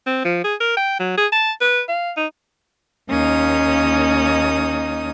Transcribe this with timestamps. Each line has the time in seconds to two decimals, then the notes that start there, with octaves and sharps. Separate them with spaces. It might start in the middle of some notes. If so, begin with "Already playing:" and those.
0.07 C4
0.25 F3
0.44 G#4
0.60 A#4
0.77 G5
0.99 F#3
1.18 G#4
1.32 A5
1.61 B4
1.89 F5
2.17 D#4
3.10 D#2 A#3 C#4 D#4 D#6